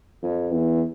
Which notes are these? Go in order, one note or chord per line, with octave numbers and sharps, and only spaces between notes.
F2
E2